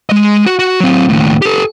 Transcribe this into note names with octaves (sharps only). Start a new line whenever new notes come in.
G#3 D#5
F#4
F#4
F#3 C4
D#2 A2
G4 A4